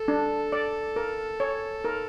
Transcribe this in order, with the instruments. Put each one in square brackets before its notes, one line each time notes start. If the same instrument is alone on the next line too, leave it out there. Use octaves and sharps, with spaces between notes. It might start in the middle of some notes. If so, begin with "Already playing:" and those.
Already playing: [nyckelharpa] A4
[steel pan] D4
D5
A#4
C#5
A#4